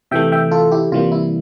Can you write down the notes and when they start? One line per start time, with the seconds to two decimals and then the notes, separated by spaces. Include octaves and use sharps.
0.11 C3 E3 A3 E5 G5
0.32 E5 G5
0.52 F4 A4
0.72 E4 G4
0.92 C3 E3 G3 A#3 F4
1.12 E4